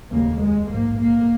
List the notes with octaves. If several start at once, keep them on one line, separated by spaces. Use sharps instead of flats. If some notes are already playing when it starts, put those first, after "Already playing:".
F1 D#2 C#3 A#3
G#3
A#1 G#2 A#3
A#3